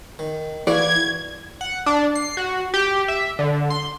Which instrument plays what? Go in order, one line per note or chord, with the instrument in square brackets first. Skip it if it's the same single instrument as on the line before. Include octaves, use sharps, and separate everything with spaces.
[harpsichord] D#3
[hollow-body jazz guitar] E3 [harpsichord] F#4 B4 F5 [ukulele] D5 [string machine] G#6
[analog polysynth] F#5
D4
C7
F#4
G4
E5
D3
C6